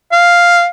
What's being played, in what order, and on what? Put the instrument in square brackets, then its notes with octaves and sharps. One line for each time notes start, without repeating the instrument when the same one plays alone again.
[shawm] F5